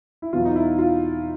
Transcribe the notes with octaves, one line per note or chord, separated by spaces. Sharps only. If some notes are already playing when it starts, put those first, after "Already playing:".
E4
E2 B2 F#3 F4
D#4
E4
F4